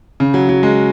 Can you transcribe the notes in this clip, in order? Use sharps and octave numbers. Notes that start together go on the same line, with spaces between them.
C#3
F#3
F#3
G#3